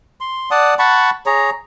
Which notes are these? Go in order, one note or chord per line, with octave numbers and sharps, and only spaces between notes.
C6
D5 F#5 A5 D#6
F#5 A5 B5 C#6
G#4 C#5 A#5